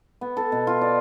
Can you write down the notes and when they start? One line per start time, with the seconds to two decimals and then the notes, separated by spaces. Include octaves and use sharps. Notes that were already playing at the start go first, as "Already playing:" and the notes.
0.21 B3
0.37 A4
0.52 B2
0.67 F4
0.81 D5